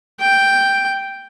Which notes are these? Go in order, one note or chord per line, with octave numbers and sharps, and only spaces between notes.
G5